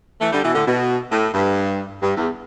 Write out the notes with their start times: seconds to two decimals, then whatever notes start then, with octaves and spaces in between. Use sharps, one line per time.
0.21 E3 A3
0.32 D3 G3
0.44 B2 E3
0.55 A2 D3
0.66 B2
1.11 A2
1.34 G2
2.01 G2
2.16 E2